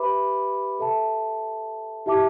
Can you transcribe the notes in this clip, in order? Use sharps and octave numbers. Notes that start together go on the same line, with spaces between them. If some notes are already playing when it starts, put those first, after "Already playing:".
Already playing: G4 B4 E5 B5 D6
A4 E5 A5
E4 G4 E5 A5 D6